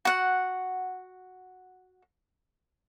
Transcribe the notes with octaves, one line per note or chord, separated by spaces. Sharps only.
F#4 F#5